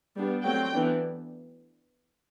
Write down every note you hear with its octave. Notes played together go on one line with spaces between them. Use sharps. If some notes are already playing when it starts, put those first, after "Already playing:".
G3 B3 D4
F#3 A3 C4 G5
E3 B3 D4